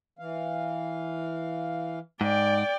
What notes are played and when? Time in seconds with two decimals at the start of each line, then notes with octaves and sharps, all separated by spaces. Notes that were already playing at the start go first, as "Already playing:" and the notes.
0.19 E3 F5
2.21 G#2 D5 G5